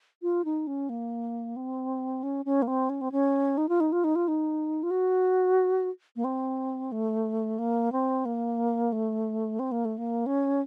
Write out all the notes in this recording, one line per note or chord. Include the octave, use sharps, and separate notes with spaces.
F4
D#4
C#4
A#3
C4
C#4
C#4
A#3
C4
C#4
C4
C#4
D#4
F4
D#4
F4
D#4
F4
D#4
F4
F#4
A#3
C4
A3
A#3
C4
A#3
A3
C4
A#3
A3
A#3
C#4